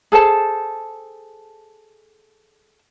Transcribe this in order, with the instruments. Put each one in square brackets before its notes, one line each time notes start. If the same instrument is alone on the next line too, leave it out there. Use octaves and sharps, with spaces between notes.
[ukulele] G#4 A4 C5 A5